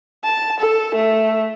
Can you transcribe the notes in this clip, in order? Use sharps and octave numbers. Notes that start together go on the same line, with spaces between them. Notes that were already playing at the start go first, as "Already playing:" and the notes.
A5
A4
A3